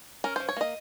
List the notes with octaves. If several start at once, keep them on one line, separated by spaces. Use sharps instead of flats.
C#4 A#4
F3 C5
C#5
A#3 D#5